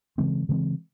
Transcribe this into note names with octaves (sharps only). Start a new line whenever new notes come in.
C#3 E3 G#3 C4
C#3 E3 G#3 C4